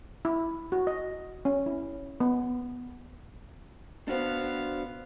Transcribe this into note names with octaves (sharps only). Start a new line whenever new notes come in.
E4
F#4
D#5
C#4
E4
B3
B3 D4 F#4 C5 F5